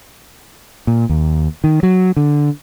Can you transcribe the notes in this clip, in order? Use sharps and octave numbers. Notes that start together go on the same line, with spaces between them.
A#2
D#2
D#3
F#3
D3